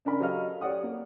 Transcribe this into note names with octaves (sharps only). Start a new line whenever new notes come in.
C#3 D4 A#4 B5
F#3 G4 A4 D#5 F5 F6
G4 C#5 D5 F#5 D#6
A#3